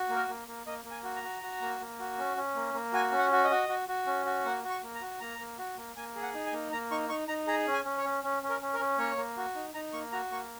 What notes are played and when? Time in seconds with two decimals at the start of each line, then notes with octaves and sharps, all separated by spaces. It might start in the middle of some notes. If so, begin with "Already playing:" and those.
Already playing: F#4
0.09 A#3
0.16 A#4
0.28 A#3
0.48 A#3
0.67 A#3 D#5
0.85 A#3
0.91 G#5
1.04 F#4
1.16 A#5
1.24 F#4
1.42 F#4
1.61 A#3
1.80 A#3
1.99 F#4
2.18 C#4
2.37 C#4
2.56 A#3
2.74 A#3
2.93 F#4 G#5
3.12 C#4
3.18 F#5
3.32 F#4
3.44 D#5
3.50 F#4
3.69 F#4
3.88 F#4
4.07 C#4
4.26 F#4
4.45 A#3 F#5
4.63 F#4
4.70 C#6
4.83 A#3
4.95 A#5
5.01 F#4
5.20 A#3 A#5
5.39 A#3
5.58 F#4
5.77 A#3
5.96 A#3 G#5
6.16 G#4
6.22 F#5
6.34 D#4
6.46 G#5
6.52 A#3
6.72 A#3 A#5
6.91 D#4 C#6
7.09 D#4 C#6
7.28 D#4 A#5
7.47 G#4 A#5
7.67 C#4
7.73 G#5
7.85 C#4
7.97 C#5
8.05 C#4
8.24 C#4
8.43 C#4
8.49 A#4
8.62 C#4
8.74 A#4
8.80 C#4
8.99 A#3 C#5
9.17 A#3
9.37 F#4
9.55 D#4
9.74 D#4 A#5
9.93 A#3 C#6
10.12 F#4 A#5
10.31 A#3 C#6